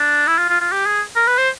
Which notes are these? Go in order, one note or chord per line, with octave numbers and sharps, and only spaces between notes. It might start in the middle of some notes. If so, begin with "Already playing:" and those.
Already playing: D4
E4
F4
F4
F4
G4
G#4
A#4
B4
C5